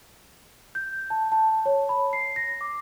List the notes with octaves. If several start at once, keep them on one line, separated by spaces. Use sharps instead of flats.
G6
A5
A5
C#5
B5
C7
A#6
D6